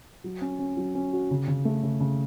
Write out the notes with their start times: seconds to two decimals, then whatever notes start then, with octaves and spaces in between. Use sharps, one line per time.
0.24 F#3
0.41 C#4
0.59 C#4
0.77 F#3
0.95 C#4
1.13 F#4
1.31 C#3
1.48 C#3
1.65 A3
1.83 C#3
2.00 C#3